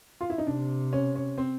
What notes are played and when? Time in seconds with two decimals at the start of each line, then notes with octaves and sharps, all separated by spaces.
0.21 F4
0.30 E4
0.38 D#4
0.47 C3 D4
0.93 C#4
1.15 C#4
1.38 C4